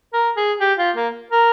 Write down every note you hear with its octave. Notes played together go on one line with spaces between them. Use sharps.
A#4
G#4
G4
F4
A#3
A#4